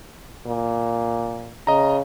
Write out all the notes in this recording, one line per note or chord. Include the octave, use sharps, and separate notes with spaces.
A#2
C#3 D#5 A#5